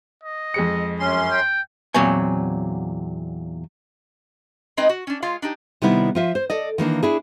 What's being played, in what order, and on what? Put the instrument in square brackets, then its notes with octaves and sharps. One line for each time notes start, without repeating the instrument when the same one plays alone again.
[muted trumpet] D#5
[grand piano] F2 G#3 C#7
[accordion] F#2 C#4 C6
[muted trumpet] G5
[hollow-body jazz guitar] E2 A#2 F#3 C4 C#5 G#5
[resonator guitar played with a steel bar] G#3 C4 D#4 B4 D#5
F#4
C#4 D4
G#3 F4 F5
D4 D#4 G4
[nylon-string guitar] C3 D#3 G3 B3 E4
F3 F4 E5
C5
A4 D5 D#5
D#3 E3 A#3 D4
D4 E4 G#4